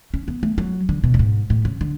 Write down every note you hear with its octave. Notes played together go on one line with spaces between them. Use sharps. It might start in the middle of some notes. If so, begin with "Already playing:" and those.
C#4
B3
A3
F#3
D3
B2
F#2
G#2
A2
C#3
D3